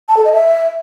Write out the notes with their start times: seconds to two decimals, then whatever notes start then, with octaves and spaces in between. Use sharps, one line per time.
0.09 A5
0.17 A4
0.25 D#5
0.33 E5